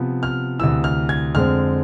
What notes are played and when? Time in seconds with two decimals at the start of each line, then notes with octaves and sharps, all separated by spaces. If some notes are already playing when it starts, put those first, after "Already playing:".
Already playing: C3 F3 B3
0.23 F6
0.59 D2 C3 E3 E6
0.84 F6
1.09 G#6
1.35 F2 D3 G#3 C4 F6